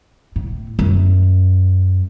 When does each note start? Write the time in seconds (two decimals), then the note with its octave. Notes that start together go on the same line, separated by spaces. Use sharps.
0.36 A2
0.79 F#2